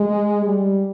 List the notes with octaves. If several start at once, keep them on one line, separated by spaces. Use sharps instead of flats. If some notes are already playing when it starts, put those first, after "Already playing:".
Already playing: G#3
G3